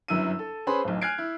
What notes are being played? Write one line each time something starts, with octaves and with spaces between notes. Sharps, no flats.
G1 F#2 E4 E6 D#7
A4
C#4 G#4 B4 C5 B5 C6
D1 B1
G#5 F6 F#6 G#6 C7 D7
E4